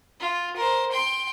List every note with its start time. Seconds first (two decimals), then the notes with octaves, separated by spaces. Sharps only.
0.20 F4
0.56 A#4 C5
0.91 G5 C6